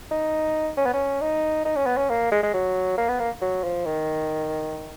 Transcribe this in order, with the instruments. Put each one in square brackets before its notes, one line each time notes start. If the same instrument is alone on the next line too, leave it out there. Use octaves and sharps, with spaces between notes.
[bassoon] D#4
C#4
B3
C#4
D#4
D#4
C#4
B3
C#4
A#3
G#3
G#3
F#3
A#3
B3
A#3
F#3
F3
D#3